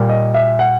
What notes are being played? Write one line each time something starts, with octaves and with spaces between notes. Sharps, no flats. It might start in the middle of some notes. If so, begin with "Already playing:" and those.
Already playing: A#2 G3 A#3
D#5
E5
F#5